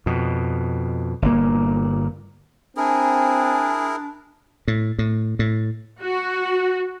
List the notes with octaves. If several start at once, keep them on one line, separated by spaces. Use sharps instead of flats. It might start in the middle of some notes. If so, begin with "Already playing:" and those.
F2 B2
G1 A#2 A#3
C4 D4 E4 G#4 A#4 G#5
A2
A2
A2
F#4